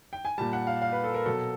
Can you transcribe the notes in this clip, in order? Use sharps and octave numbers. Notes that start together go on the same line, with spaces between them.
G5
G#5
A#2 G3 A5
F#5
F5
F5
B4
A4
A#4
B2 F#3 A4